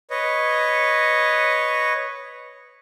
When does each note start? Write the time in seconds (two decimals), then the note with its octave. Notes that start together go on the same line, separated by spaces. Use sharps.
0.10 B4 C#5 D#5